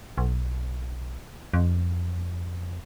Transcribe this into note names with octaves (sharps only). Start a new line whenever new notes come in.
B1
F2